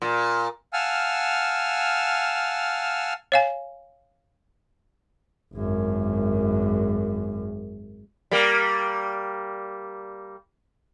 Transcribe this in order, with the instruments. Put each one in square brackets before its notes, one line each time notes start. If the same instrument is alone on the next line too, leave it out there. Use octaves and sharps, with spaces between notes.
[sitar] A#2
[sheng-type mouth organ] F5 F#5 G#5 A5 E6 F6
[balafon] C#5 F5 G#5
[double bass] G#1 F#2
[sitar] G3 A#3